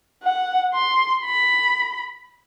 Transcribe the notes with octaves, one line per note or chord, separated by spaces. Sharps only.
F#5
C6
B5